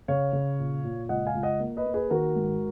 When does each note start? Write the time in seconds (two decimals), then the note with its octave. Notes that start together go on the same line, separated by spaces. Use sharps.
0.08 C#3 C#5 F5
0.33 C#3
0.59 A#2
0.84 A#2
1.09 C#2 D#5 F#5
1.27 F5 G#5
1.35 C#2
1.43 D#5 F#5
1.60 A#3
1.77 B4 D#5
1.86 A#3
1.94 G#4 B4
2.11 D#3 F#4 A#4
2.36 G#2